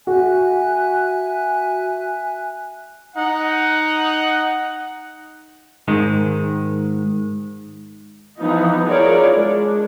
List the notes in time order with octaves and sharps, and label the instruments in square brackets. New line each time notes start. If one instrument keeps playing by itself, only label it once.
[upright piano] F#4 [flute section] E5 G#5 F#6
[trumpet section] D#4 F#5
[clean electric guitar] G#2 D#3 G#3
[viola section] E3 F3 B3 D#4
E4 F4 G#4 A#4 C#5 D5
G#3 D4